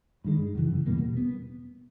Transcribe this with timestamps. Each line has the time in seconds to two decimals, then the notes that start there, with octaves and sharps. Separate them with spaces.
0.24 G2 D#3 G#3
0.55 F#2 C#3 E3
0.87 E2 B2 G3 A#3
1.17 B3